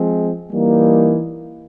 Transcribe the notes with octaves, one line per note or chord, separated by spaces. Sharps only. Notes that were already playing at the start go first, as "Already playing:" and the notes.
Already playing: F3 G#3 C4
E3 G3 A#3 D#4